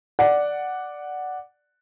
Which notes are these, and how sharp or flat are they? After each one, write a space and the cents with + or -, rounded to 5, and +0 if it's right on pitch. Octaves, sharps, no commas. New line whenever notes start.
D5 +0 F#5 +0